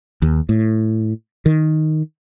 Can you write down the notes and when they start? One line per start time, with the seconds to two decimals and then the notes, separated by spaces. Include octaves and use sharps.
0.22 D#2
0.49 A2
1.46 D#3